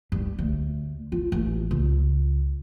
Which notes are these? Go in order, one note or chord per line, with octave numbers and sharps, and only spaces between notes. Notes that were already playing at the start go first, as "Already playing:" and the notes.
G2
D2
F4
A1
C#2